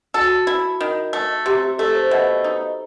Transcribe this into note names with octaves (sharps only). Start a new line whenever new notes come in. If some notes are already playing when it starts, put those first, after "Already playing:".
F#4 A4
E4
D#3
A3
C3 G4
G4
A3 A4
C5
B2 E5
D#4